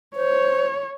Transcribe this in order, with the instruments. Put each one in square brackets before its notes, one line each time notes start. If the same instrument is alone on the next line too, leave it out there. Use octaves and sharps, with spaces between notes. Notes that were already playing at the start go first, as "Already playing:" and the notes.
[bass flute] C5 [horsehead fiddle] C#5